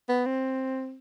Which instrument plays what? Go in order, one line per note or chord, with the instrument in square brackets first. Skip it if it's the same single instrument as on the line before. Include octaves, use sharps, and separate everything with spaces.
[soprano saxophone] B3
C4